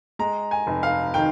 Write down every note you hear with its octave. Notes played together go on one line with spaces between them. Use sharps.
G#3 A#5
G#5
F1
F5
D#3 G5